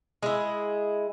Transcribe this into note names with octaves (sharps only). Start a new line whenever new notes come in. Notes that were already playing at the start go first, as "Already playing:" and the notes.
G#3 E4